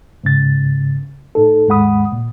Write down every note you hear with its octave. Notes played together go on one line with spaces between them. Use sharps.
G#2 C#3 A6
A2 D#4 A4
D#2 G#2 G#3 F#5 B5 D#6
A#2